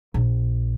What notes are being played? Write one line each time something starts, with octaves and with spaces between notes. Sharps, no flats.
A#1